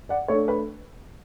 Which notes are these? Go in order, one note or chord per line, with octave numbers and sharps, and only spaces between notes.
D5 F#5
A3 D4 A4 C#5
B4